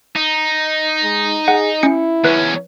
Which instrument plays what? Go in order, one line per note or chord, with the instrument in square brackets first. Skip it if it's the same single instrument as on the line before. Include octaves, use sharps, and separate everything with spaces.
[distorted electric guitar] D#4
[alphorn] G#3
[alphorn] G#4 [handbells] F#5
[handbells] C#4 C#7 [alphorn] E4
[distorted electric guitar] E2 C#4 [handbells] B4